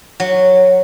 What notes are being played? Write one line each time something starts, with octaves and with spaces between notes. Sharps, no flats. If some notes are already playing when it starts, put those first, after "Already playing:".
F#3